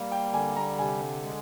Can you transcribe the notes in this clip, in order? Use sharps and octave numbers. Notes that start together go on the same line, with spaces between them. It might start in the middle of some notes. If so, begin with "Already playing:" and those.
Already playing: G3 A#3 F5
G5
D3 G#5
A#5
C3 G#5
G#3